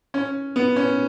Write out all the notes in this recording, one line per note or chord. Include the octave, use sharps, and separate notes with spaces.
C#4
B3
C#4